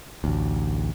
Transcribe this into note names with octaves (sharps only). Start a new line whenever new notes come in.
A1 D2